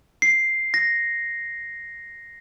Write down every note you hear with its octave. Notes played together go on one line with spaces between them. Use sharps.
C7
A#6